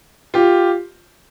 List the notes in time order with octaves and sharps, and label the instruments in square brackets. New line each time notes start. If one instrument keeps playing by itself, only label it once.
[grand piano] F4 G4